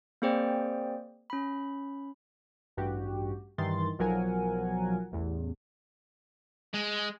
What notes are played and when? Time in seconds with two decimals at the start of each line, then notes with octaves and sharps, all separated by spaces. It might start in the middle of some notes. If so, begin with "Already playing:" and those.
0.22 A#3 C4 G#4 C5 D5 G5
1.30 C#4 B5
2.77 A1 G2 F#4 G4
3.58 G2 D#3 E3 C6 A6
3.99 B1 F3 F#3 A#4 F#5 G#5
5.12 A1 E2
6.74 G#3